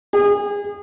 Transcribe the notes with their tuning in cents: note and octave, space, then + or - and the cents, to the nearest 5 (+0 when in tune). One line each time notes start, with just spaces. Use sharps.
G#4 -30